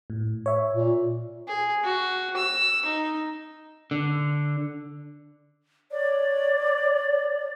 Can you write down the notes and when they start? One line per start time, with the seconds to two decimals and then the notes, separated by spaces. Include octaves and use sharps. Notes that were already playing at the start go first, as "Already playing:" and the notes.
0.10 A2
0.46 C#5 E5
0.73 A#2
1.48 G#4
1.84 F#4
2.37 E6
2.85 D#4
3.91 D3
5.92 C#5 D5